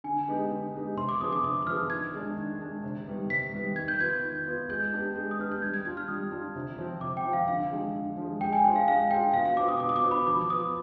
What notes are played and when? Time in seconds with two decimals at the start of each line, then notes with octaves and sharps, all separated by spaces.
0.04 D3 G#5
0.28 G#3 B3 D#4 G4
0.51 D3
0.74 G#3 B3 D#4 G4
0.97 C3 C6
1.09 D6
1.20 F3 B3 D4 G#4 D#6
1.33 D6
1.44 C3 D#6
1.62 D#6
1.67 F3 B3 D4 G#4 F6
1.90 D#3 G#6
2.13 G#3 D4
2.37 D#3
2.60 G#3 D4
2.83 C3
3.07 D#3 G3 B3
3.30 C3 B6
3.53 D#3 G3 B3
3.76 D#3 G#6
3.88 G6
4.00 B3 F4 B4 G#6
4.23 D#3
4.46 B3 F4 B4
4.69 G#3 G6
4.93 B3 D4 G4
5.16 G#3
5.31 D#6
5.39 B3 D4 G4 F6
5.52 G6
5.62 G3 G#6
5.74 G#6
5.85 D4 F4 G#6
5.97 F6
6.08 G3 D#6
6.32 D4 F4
6.56 C3
6.78 F3 C4
7.01 C3 D6
7.17 G5
7.25 F3 C4
7.33 F5
7.48 D3 F5
7.71 F3 G#3
7.94 D3
8.17 F3 G#3
8.41 G#3 G5
8.53 G#5
8.64 D4 F4 G#4 C5 G5
8.76 F5
8.88 G#3 F5
9.10 D4 F4 G#4 C5 G5
9.34 B2 F5
9.45 F5
9.57 B3 D4 F4 C5 D6
9.68 D#6
9.80 B2 D6
9.89 D#6
9.96 D6
10.03 B3 D4 F4 C5
10.11 B5
10.27 F3 D6
10.50 B3 F4 D#6